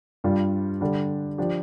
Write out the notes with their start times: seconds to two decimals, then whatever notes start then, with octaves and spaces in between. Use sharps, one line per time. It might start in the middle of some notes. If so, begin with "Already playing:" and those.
0.24 G2 G3 D4 F4
0.81 D3 G3 D4
1.38 F3 D4 G4